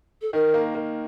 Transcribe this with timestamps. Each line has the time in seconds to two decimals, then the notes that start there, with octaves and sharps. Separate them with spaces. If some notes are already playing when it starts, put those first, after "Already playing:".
0.22 A4
0.33 D#3 A#4
0.54 A#3
0.75 A#3